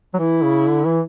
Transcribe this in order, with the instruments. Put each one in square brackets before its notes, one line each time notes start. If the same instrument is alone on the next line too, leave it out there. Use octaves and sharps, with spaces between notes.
[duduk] F#3
[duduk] E3 [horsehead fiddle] E4
[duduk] C#3
D3
E3